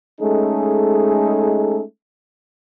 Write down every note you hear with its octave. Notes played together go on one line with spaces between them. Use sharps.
G#3 A3 C#4 D#4 G#4 A4